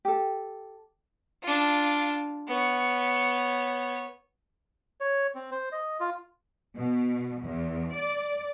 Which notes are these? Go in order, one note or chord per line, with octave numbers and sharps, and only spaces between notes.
G4 A4
D4 F4
B3 C#5
C#5
C4
C5
D#5
F4
B2
E2
D5